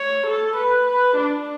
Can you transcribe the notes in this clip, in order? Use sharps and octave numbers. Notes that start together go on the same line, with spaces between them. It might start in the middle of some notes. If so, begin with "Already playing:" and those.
Already playing: C#5
A4
B4
B4
D4